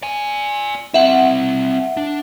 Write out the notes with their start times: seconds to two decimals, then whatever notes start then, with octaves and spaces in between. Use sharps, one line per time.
0.03 D5 G#5
0.94 C4 E4 E5 F#5
1.97 D4